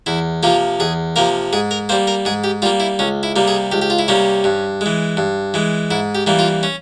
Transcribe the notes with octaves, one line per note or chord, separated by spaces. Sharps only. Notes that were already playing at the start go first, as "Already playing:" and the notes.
E2 E4
C3 F3 A#3 F4
E2 G#4
C3 F3 A#3 A#4
G#2 G#4
A#4
G3 A#3 C5
A#4
G#2 G#4
G4
G3 A#3 F4
E4
C#2 C#4
E4
C3 G3 A#3
G#4
C#2 G4
G4
F4
E4
C3 G3 A#3 C#4
G2
E3 G#3
G2
E3 G#3
G#2 E4
G4
E3 G3 A#3
F4
C#4